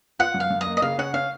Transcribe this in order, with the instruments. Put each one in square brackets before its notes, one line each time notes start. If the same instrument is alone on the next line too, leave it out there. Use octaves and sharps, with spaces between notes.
[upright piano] F4 [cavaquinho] F#5
[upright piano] F#2
[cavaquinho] F5
[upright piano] F#2
[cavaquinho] D#5
[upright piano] A#3
[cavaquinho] D#5
[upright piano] C#3 [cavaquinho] F5
[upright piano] C#4 [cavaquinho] F#5
[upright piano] C#4 [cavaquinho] F5